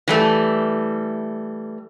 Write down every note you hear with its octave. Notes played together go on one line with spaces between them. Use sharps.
E3 G3 A3